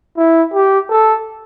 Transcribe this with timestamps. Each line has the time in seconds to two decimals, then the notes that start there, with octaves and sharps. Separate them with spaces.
0.18 E4
0.54 G4
0.91 A4